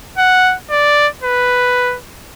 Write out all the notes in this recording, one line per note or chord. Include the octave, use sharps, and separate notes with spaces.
F#5
D5
B4